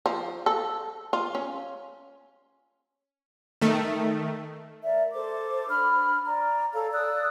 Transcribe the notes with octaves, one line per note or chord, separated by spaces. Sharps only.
F3
A4
F4
C#4
D#3 A3
A#4 D5 E5
A4 C5 D6
D4 B5 F6
D5 A#5
A4 C#5 F5 A#5
D5 D#6 E6 F#6